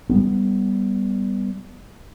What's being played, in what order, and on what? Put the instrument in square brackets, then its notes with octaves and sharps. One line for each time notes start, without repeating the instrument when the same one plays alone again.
[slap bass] G3 B3